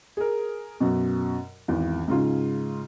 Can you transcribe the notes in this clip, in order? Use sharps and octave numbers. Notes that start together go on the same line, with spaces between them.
G#4 A#4
F#2 B2
G#1 E2
G#2 C#3 F4